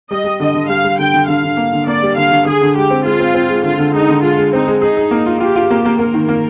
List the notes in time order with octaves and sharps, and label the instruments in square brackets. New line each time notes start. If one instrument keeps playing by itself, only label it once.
[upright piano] G3 [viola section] D#5
[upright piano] G3
[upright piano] D3 [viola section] D#5
[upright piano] D3
[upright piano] G3 [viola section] F5
[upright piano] G3
[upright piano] D3 [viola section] G5
[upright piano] D3
[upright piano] D3 [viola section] F5
[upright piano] D3
A#3
D3
[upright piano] A#3 [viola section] D5
[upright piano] G3
[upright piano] D3 [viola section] F5
[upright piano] D3
[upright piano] D3 [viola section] G#4
[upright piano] D3
[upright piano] G#3 [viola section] G4
[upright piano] C4
[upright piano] G#3 [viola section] F4
[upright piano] C4
C4
G#3
[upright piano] D3 [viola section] F4
[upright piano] D3
[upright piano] G#3 [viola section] D#4
[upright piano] D3
[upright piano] G#3 [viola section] F4
[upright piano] G#3
[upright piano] C4 [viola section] D#4
[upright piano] G#3
[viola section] D#4 [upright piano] G#4
[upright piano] G#4
A#3
F4
[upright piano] F4 [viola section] G4
[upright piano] F4
A#3
A#3
[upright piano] A#3 [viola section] A#4
[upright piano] D#3
A#3